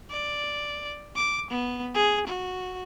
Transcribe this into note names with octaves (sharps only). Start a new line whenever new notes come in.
D5
D6
B3
G#4
F#4